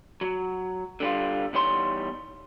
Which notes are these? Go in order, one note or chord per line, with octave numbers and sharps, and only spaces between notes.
F#3
D3 G3 F4
E2 G3 D#4 C#5 C6